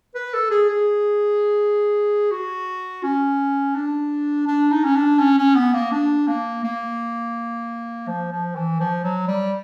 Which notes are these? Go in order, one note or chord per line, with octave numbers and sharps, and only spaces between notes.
B4
A4
G#4
G#4
F#4
C#4
D4
D4
D#4
C#4
D4
C#4
C#4
B3
A#3
D4
A#3
A#3
F3
F3
E3
F3
F#3
G3